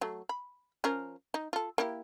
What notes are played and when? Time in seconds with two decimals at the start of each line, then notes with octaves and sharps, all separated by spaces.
0.01 F#3 A3
0.29 B5
0.84 F3 C#4 A#4
1.34 D#4
1.53 F4 A4
1.78 A#3 E4 G4